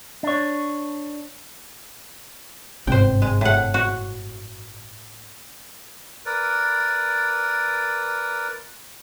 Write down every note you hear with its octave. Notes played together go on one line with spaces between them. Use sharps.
D4 C#5
G1 G#2 C3 C5 G5
G#3
A2 F#5
F#4
A#4 B4 D5